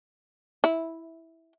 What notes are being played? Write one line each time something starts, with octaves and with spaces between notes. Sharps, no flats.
E4